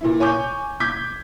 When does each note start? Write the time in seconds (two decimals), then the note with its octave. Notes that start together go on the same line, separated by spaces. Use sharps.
0.01 A#2 E3 E4
0.20 C#5 G#5 C#6 D6 G6
0.80 D6 G6 G#6 B6